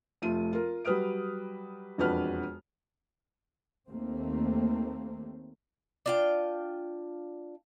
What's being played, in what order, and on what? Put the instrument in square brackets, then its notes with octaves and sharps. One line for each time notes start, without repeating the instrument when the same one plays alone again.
[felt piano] F1 A3 F4 D#7
F4 A#4
F#3 G3 B4 D#6 F6 D7
E1 F2 D4 F#4 B4 F6
[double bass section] D#2 A3 A#3 C4
[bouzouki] D4 F4 G5